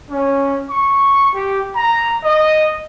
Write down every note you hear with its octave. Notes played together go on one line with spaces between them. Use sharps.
C#4
C#6
G4
A#5
D#5